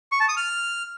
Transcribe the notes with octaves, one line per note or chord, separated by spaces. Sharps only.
C#6
A5
D#6
F6